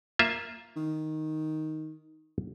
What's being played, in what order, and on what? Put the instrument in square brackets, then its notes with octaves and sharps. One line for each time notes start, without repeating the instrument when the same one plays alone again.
[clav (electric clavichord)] A#3 F4 E5
[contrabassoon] D#3